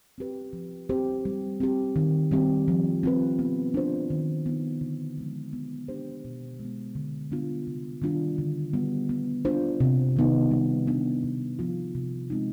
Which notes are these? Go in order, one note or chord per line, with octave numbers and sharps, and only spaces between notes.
C4 G4 B4
F3
C4 G4 C5
G3
C4 G4
D#3
G3 C4 G4
F3
C4 F4 B4
B3
D4 F4 C5
D#3
B3 D#4
D3
F3 G#3
B3
D4 G4 C5
B2
G#3 B3
D3
G3 B3 D4 F4
C3
D#3 G3 D4 F4
D3
G3 B3
B3
D4 F4 C5
C3
D#3 B3 D#4
G3
B3 D4
C3
F3 B3 F4
C3
F3 G#3 C4 D#4